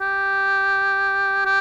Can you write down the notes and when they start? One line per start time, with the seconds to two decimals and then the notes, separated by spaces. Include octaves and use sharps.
0.01 G4
1.45 G4